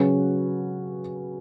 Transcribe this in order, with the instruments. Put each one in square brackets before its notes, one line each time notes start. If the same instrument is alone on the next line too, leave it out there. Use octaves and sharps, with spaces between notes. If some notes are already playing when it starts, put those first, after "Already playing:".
Already playing: [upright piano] C#3 F#3 C#4 F#4 B4